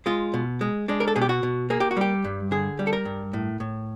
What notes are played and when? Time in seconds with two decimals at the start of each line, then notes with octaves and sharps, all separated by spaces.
0.06 G#3 F4
0.34 B2
0.61 G#3
0.88 G#3 D4
1.00 A#4
1.08 A4
1.16 B2 G#4
1.22 G4
1.29 F#4
1.43 B2
1.70 A#3 G#4
1.80 G4
1.91 F#4
1.97 G3 G4
2.24 G2
2.51 D3 G#4
2.79 G3
2.87 A4
2.93 A#4
3.05 G2
3.33 A2
3.60 A2